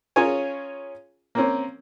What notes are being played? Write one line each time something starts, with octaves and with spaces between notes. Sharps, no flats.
C#4 F4 G#4 A#4 C#5 G#5
A#3 C4 C#4